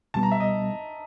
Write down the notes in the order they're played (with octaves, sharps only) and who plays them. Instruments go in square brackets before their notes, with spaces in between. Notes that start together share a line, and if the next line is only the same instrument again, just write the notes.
[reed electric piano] C#2 B2 G3 B3 [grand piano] A5
[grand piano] A#5
E5
D#5